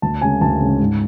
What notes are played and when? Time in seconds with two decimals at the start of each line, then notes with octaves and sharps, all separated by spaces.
0.02 D2 A5
0.21 C#3 G#3 C#4 G#5
0.41 D2 A5
0.60 C#3 G#3 C#4
0.80 G#2